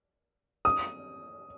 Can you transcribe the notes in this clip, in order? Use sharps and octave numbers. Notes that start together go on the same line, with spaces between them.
D#6